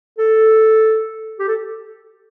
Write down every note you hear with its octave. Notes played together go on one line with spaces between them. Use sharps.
A4
G4
A4